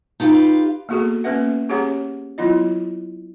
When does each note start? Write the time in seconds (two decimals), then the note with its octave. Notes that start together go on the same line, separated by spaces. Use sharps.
0.20 D#4 F4 G4 B4 F5
0.89 A#3 B3 F#4 G#4 A4
1.24 A#3 B3 C#4 B4 E5 F#5
1.69 C#4 G4 G#4 C#5 F#5 A#5
2.38 F#3 B3 E4 F4 D#5